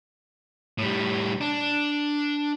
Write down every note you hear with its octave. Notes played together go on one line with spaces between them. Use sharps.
A2 G3
D4